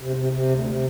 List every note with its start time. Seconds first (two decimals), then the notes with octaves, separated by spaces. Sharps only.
0.01 C3
0.16 C3
0.33 C3
0.49 D2
0.66 C3